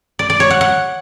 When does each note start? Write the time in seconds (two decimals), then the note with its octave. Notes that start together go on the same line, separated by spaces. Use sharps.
0.19 D5
0.30 D5
0.40 C#5
0.50 F#5
0.61 F#5